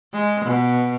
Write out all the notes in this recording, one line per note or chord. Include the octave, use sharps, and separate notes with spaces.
G#3
B2